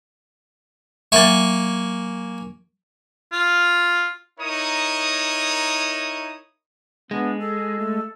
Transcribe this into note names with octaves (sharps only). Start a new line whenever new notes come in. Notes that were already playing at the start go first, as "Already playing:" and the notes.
F#3 A#3 E5 G#5 C#6
F4
D#4 E4 A#4 C#5 D#6
G#3 B3 D4
G#4 A4
A3